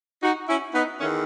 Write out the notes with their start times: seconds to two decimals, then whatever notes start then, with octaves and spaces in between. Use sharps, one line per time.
0.23 D#4 F#4
0.48 C#4 E4
0.74 B3 D#4
1.00 E2 D#3 A3 C#4